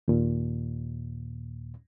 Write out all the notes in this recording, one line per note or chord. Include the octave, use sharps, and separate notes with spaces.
D#2 A#2